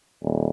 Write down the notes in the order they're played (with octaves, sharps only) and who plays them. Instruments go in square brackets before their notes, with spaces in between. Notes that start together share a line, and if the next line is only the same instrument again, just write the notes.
[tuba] D#1